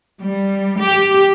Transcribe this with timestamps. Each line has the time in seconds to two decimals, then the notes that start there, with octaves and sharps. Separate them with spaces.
0.22 G3
0.80 G4